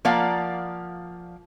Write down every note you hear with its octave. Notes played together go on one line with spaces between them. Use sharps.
F3 A#3 D5 F5 F#5 A#5